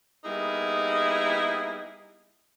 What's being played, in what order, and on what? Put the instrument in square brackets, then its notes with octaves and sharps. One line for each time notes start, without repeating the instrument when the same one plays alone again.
[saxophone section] G3 A#3 B3 D#4 E4 G#4